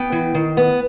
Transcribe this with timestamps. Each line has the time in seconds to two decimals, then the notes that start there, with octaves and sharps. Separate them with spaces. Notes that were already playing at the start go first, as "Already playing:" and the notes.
Already playing: B3 G5
0.12 E3
0.35 D#3
0.57 B3